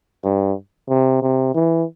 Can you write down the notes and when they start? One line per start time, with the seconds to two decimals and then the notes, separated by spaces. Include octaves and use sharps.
0.24 G2
0.89 C3
1.22 C3
1.55 E3